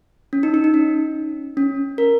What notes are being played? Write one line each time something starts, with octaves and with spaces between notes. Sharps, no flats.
C#4
D#4
D#4
D#4
C#4
C#4
A#4